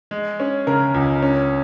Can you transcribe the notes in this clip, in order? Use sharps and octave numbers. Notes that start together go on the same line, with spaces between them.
G#3
C#4
C#3 A#4
C#2
C#4